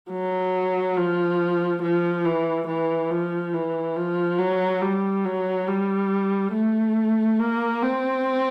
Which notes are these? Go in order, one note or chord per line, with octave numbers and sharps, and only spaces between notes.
F#3
F3
F3
E3
E3
F3
E3
F3
F#3
G3
F#3
G3
A3
A#3
C4